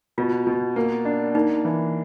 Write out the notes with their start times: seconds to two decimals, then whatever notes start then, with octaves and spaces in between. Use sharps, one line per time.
0.18 B2 F4
0.47 B2
0.76 A#3
1.05 D4
1.35 A#3 D#4
1.65 E3